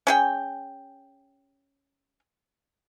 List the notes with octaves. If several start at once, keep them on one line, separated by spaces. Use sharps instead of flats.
C#4 G#4 G5